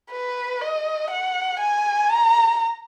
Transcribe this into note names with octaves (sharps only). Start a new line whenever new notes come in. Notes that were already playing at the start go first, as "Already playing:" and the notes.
B4
D#5
F#5
G#5
A#5